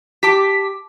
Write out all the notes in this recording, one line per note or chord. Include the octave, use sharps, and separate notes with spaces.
G4 A5 D6 B6